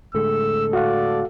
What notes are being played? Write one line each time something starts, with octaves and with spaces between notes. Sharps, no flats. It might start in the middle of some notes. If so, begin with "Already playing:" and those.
A2 D3 G#3 A4 E6
F#4 D5 F5 F#5